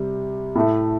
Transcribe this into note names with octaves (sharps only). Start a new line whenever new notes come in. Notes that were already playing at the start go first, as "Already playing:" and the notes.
Already playing: C3 G3
A2 A3